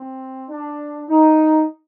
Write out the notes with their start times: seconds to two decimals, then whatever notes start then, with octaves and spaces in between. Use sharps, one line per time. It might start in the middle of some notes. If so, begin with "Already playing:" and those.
Already playing: C4
0.50 D4
1.09 D#4